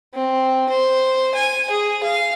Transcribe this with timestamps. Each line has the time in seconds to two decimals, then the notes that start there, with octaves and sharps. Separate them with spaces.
0.14 C4
0.69 C5
1.35 G#5
1.71 G#4
2.03 F5